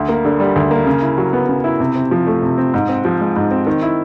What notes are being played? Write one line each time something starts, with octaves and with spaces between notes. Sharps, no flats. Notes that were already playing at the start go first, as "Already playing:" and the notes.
Already playing: D2
A#3
D3
G3
D2
A#3
C#3
E4
F#3
B3
C#3
E4
C3
C4
F3
A3
C3
C4
G#2
C4
F3
G#3
G#2
C4
D#3
E4